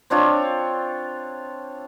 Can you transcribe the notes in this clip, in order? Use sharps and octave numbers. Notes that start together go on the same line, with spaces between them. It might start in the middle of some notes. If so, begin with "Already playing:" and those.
C4 D4 F4 C#5